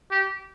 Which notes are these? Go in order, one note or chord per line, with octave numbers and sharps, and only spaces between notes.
G4